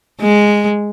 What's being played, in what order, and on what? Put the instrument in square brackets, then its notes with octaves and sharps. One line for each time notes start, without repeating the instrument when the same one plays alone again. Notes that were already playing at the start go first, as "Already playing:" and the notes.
[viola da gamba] G#3